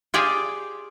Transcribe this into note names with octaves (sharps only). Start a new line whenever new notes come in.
F4 G4 G#4 D5 G5